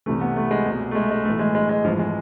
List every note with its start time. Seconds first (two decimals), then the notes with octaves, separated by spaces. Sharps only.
0.06 C2 C3 E3 A3
0.21 B3
0.36 A3
0.51 G#3
0.66 C2 B2
0.91 A3
0.95 G#3
1.11 G#3
1.25 B1 A2 E3 A3
1.39 G#3
1.55 G#3
1.69 G#3
1.84 G#1 G#2 E3 F3
1.99 G#3